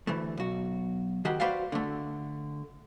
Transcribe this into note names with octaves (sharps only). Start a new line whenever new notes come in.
D2 E3 A3
B1 F#4
D#3 G#3 F#4 G4
F#4 B4 C5 D5 F5
D3 A3